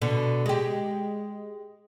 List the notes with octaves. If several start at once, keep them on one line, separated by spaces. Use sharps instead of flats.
B2 D3
G#3 G4